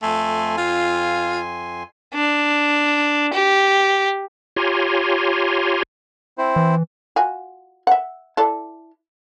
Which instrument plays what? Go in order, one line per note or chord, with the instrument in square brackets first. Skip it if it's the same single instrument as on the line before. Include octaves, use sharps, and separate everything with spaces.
[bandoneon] F2 G#5 C6 [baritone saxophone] A3
[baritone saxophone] F4
[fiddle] D4
G4
[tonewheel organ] F4 G4 C#5 G#5 A#5 C6
[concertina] C4 E4 C5
[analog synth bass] E3
[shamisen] F4 F#4 G#5
E5 F#5
E4 A4 D5